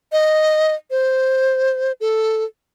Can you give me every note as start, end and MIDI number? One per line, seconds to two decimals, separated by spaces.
0.12 0.74 75
0.91 1.92 72
2.00 2.44 69